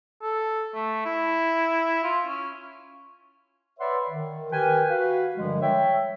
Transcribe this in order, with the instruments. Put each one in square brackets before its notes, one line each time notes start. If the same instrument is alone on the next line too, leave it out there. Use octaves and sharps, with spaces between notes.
[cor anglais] A4
A3
E4
F4
C#4
[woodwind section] B4 C#5 D5 E5 F#5 C6
D#3
G4 A#4 B4 G5 G#5
F#4 B4 F5
G2 D3 D#3 F3 G3 G#3
C#5 E5 G5